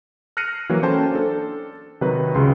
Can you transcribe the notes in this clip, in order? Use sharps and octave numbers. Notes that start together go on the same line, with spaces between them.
F6 F#6 A#6 C7 C#7 D#7
E3 F#3 A#3 F#4
A#3 C#4 A4 C5 G5 A5
D4 A4
C3 D#3 F#3 D#4 F#4 B4
C#2 C#3 C6